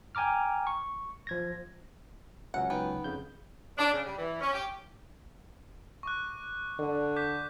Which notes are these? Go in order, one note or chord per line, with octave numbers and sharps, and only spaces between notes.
G5 G#5 A#5 D6 F6
C#6
F3 G#6 A#6
C#2 F#3 C#4 F#5
B3 D#4 B4 G5
F2 C#3 G6
D4
C#3
G3
E3
C#4
G4
C#6 D6 F#6
D3
D6 G6 B6